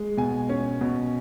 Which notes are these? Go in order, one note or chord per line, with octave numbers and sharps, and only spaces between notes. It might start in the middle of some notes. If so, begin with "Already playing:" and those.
Already playing: G#3
B2 G#5
C#4
B2